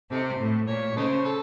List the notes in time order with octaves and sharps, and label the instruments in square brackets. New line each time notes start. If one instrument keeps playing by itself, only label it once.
[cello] C3 [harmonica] D#4 A4 C5
[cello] A2
[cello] A#2 [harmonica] C#5
[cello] C#3 [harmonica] D#4 A4 C5
[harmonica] A4